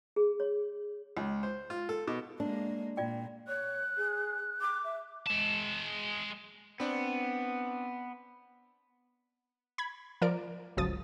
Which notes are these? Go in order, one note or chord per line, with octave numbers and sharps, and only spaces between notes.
G#4
C#5
C#2
C5
F4
A4
B2
G#3 A#3 D4
A#2 F4 D5 G5
C#5 F#6
G#4
D6
E5
G#3 A5
B3 C4 D4
B5 G#6
F3 A#4 D5 D7
G1 C#2 F3 F#3 D#6 A6